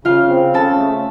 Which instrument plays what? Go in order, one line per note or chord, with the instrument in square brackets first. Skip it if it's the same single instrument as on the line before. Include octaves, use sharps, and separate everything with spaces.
[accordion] C#3 [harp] F4 F5
[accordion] C4
[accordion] C#3 [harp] A4 A5
[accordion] A3